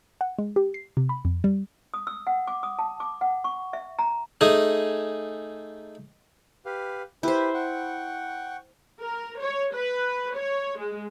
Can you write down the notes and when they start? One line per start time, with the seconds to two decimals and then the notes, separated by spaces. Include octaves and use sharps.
0.21 F#5
0.38 G#3
0.56 G4
0.74 C7
0.97 C3
1.09 B5
1.25 F2
1.44 G3
1.94 D#6
2.07 E6
2.27 F#5
2.47 D6
2.63 D#6
2.79 A5
3.00 D6
3.21 F#5
3.44 C#6
3.73 E5
3.99 A#5
4.41 A3 D#4 G#4 G#5
6.65 G4 B4 F5
7.23 E4 G4 B4 C5
7.54 F#5 G5 C#6
9.00 A#4
9.39 C#5
9.73 B4
10.35 C#5
10.78 G#3